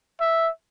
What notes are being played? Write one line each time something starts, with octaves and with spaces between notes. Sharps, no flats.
E5